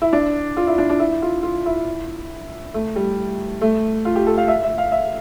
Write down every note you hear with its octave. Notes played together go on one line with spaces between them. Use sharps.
E4
D4
F4
E4
D4
D4
E4
F4
F4
E4
A3
G3
A3
F4
G4
A4
F5
E5
E5
F5
E5